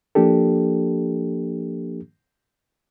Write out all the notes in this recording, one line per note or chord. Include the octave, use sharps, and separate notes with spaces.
F3 A#3 D4 G4 A4